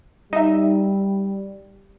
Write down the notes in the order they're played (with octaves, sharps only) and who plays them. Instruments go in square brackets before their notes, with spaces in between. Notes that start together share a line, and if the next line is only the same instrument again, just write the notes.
[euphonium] G3 [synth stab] D#4 E5